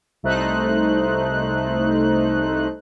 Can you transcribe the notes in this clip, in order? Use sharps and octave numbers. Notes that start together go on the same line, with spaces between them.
C2 A3 D#4 C5 F#6